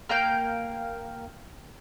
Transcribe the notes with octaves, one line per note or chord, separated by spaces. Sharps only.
A#3 F5 G5